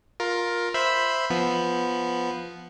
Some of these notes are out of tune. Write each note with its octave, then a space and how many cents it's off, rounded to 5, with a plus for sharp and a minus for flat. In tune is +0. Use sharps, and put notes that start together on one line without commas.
F4 +15 A#4 +10
C5 +0 E5 +0 B5 +0
F3 +0 B3 +0